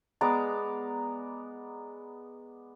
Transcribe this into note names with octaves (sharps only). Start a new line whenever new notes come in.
G#3 B3 D5 A#5